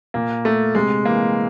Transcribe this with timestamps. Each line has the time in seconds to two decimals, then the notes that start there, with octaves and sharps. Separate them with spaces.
0.14 A#2 A#3
0.45 A3
0.75 C3 G#3
1.05 E3 A#3